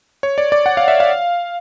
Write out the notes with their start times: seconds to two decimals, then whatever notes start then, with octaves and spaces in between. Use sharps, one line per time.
0.23 C#5
0.38 D5
0.52 D5
0.66 F#5
0.77 F5
0.88 E5
1.00 F5